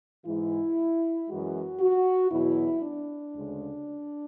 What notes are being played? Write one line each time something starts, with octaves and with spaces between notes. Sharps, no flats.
G#2 E3 G#3 E4
F#2 E3 G#3 F#4
F#4
E2 B2 F#3 E4
D4
D2 C#3 G#3